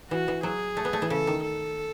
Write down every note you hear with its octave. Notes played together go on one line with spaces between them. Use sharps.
E3 F#4
E3
F#3 G#4
A3
B3
A3
E3
C#3 A4
D#3
A4